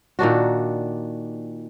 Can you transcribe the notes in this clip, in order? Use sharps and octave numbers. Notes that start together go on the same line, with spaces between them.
A#2 D#3 D4 F#4